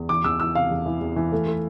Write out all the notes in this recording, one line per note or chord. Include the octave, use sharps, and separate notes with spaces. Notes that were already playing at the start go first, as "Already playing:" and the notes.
Already playing: E2
E3 D6
E2 E6
E3 E6
C3 F5
E2
E3
E2
E3
A3
A3